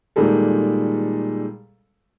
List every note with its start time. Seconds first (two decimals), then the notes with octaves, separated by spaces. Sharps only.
0.16 A#2 D#3 G3 G#3 A4